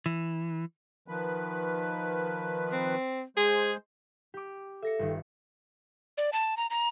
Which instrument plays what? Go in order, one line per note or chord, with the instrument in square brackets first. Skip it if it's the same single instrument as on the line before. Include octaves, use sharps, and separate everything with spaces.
[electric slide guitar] E3
[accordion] D#3 F3 B4
[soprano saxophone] C4
[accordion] G#3 C5 [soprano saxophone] G#4
[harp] G4 D6
[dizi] A4 [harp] E5 A#6 C#7
[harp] G1 D#3
[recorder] D5
A5
A#5
A#5